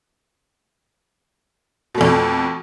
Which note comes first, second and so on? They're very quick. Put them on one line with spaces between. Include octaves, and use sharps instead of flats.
B2 A3 F2